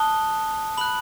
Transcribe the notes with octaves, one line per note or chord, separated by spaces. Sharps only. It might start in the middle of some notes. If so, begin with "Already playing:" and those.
Already playing: A5 D#6 F#6 G7
B5 F#6 F#7